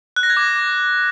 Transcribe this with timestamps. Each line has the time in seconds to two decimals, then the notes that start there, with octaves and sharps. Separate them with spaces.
0.16 F#6
0.23 A#6
0.30 G#6
0.37 D6